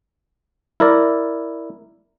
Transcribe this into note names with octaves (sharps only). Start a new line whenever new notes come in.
E4 A#4 D5